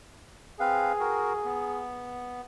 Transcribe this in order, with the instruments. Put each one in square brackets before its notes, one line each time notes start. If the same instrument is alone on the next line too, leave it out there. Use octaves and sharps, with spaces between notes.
[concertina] C4 B4 F5 [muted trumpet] G#4
[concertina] F#4 A#4
B3